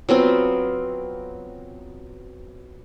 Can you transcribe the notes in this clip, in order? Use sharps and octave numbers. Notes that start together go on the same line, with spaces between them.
F#3 B3 C4 F4